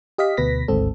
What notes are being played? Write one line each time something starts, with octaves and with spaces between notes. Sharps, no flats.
G4 D#5 F5 B6
D2 B2 B4 A#6 B6
G#1 D2 G#2 C4 A4